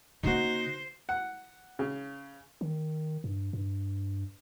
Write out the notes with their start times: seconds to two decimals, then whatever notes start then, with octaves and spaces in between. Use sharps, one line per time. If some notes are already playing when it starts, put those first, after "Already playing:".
0.23 C#3 A#3 D#4 F#4 C5
1.09 F#5
1.79 C#3
2.61 D#3
3.24 G2
3.53 G2